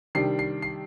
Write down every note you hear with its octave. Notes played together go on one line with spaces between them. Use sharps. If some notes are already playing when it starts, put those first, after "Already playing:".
C3 D#3 G3 D4 C7
C7
C7